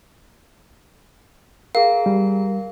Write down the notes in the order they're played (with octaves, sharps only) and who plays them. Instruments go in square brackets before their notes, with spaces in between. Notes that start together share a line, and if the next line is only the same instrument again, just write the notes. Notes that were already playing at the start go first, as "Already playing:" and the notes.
[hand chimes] G#4 A#4 [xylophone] F5
[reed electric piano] G3